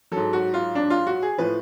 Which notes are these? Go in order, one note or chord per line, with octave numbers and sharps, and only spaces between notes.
G#2 F#3 A4
F#4
F4
D4
F4
F#4
G#4
A2 F3 B4